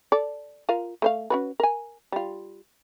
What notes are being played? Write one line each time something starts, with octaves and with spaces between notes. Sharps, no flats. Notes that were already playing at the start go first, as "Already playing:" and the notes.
A4 D5
F4 A#4 F5
A3 C5 F5
C#4 F#4 B4
A#4 G#5
G3 F4